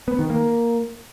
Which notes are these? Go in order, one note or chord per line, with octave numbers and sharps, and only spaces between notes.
B3
D#3
A#3